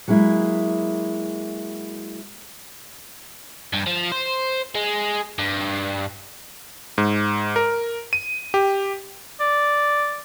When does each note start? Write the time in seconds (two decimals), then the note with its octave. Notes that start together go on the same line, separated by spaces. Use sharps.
0.08 F#3 G#3 A#3 E4
3.73 G2
3.86 F3
4.12 C5
4.75 G#3
5.38 G2
6.98 G#2
7.56 A#4
8.13 D#7
8.54 G4
9.40 D5